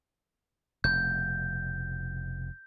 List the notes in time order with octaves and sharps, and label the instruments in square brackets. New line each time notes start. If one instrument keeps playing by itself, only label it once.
[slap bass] F1 B2 [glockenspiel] G6